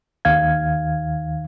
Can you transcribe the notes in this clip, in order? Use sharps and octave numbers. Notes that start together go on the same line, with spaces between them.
D#2 D#3 F5 G#6